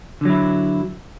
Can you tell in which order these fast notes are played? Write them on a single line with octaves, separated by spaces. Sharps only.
D3 F#3 E4